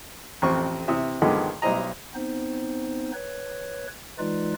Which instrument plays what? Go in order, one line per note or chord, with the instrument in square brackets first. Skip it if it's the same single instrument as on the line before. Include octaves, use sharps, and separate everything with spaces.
[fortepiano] A1 F2 C4 C#6
C3 E3 E5 D#6
G2 D3 D#3 F3 G#3 B3
B1 G3 E4 C5 D#5 A#5
[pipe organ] B3 C4 D#4 C5
B4 C#5
E3 G#3 D#4 F4 B4 D5